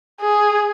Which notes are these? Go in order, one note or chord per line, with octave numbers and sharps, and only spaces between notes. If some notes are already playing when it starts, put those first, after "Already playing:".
G#4